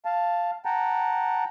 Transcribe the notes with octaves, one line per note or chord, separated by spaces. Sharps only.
F5 A5
F#5 G5 A5 A#5